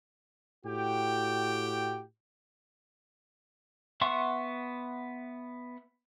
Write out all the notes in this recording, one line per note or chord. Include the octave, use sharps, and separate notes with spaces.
A2 F#4 G4 G5
B3 E5 F#5 C6 C#6